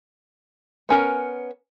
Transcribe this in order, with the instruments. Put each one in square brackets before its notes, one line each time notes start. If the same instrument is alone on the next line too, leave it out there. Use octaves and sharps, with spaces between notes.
[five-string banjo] B3 C#4 A#4 G#5